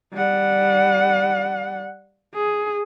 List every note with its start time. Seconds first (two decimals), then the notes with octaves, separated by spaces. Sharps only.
0.13 G3 F#5
2.35 G#4